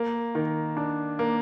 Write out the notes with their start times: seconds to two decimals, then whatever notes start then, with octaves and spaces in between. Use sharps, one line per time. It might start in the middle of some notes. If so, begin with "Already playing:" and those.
Already playing: A#3
0.35 D#3
0.77 D4
1.19 A#3